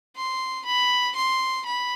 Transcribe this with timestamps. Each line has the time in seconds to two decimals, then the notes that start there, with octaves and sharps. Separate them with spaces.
0.16 C6
0.65 B5
1.16 C6
1.66 B5